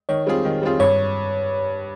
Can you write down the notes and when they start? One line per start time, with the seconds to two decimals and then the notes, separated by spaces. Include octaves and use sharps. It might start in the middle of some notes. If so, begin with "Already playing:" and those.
0.09 D#3 C#5
0.26 G3 C4 F4 G#4
0.45 D#3
0.62 G3 C4 F4 G#4
0.80 G2 C#5